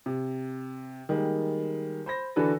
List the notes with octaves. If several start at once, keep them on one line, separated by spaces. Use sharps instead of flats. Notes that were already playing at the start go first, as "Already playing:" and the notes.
C3
D#3 G3 G#3 A#3
C5 B5 A#6
D3 E3 D4 F#4 A4 B4